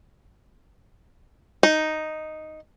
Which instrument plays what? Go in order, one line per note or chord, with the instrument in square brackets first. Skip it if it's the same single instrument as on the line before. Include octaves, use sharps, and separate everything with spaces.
[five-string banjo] D#4